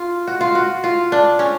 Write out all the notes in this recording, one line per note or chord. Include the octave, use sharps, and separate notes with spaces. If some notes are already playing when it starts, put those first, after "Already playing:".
Already playing: F4
F#4
F4
F#4
F4
D4
C#4